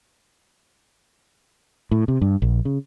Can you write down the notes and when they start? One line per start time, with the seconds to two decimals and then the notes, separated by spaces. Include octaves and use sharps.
1.91 A2
2.08 C3
2.21 G2
2.42 A#1
2.65 C#3